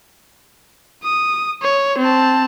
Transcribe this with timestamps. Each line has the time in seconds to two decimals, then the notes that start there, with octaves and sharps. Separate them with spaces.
1.03 D#6
1.63 C#5
1.99 C4 A5